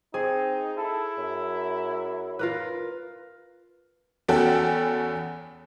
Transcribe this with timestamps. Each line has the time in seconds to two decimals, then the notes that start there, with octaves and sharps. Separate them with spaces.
0.14 C4 D#4 G#4
0.78 E4 A4
1.17 F#2
2.39 F4 A#4 B4
4.28 E2 C#4 F#4 A4 F#5 G5